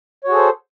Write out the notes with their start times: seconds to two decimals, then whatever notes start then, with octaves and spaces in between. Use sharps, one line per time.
0.24 C#5
0.28 F#4
0.31 G#4
0.34 A4
0.37 C5